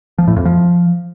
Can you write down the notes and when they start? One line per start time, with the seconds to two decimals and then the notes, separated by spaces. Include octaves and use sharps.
0.18 F3
0.27 A2
0.36 F2
0.45 F3